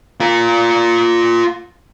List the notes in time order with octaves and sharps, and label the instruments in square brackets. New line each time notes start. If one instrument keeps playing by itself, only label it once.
[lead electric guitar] F4 A#4